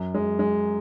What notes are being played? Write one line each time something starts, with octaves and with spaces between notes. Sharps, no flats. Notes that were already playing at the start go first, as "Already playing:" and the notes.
Already playing: F#2
G#3
G#3